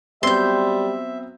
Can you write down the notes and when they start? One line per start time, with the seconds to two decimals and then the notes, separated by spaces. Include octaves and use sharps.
0.23 F#3 G3 B3 C4 E5 C6 G6